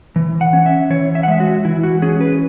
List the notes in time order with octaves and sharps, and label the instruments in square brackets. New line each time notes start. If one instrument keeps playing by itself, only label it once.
[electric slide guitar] E3
F#5
C#4
E5
E3 C#5
E5
F#5
G#3 E5
F#4
E3 E4
F#4
C#4 G#4
B4